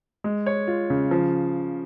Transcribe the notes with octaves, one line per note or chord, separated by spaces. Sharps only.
G#3
C#5
F4
C#3
F3